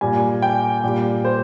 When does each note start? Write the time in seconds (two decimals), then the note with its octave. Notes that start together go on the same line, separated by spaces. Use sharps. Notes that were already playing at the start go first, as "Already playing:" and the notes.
0.01 A#2 G3 G#5
0.42 G5
0.84 A#2 G3
1.25 C5